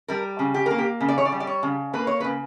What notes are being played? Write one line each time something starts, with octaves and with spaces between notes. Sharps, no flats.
G3 A#4
C#3
G4
A#3 A#4
G4
C#3
D5
C#5
D5
G3
D5
C#5
C#3
A#3 B4
C#5
B4
C#3